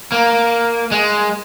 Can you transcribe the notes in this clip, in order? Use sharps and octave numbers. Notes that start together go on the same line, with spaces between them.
A#3
G#3